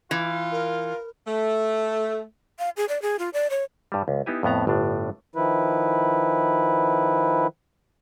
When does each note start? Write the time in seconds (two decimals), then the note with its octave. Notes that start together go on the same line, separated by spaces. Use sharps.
0.11 E3 F4
0.52 A#4
1.27 A3
2.59 F5
2.77 G#4
2.88 D5
3.02 G#4
3.19 F4
3.33 D5
3.50 C#5
3.92 G2 G3
4.08 C#2
4.26 B3 D#4 E4 G4 G#5
4.43 F2 A2 B3 A#5
4.67 G1 A2 D4
5.36 D#3 F3 E4 B4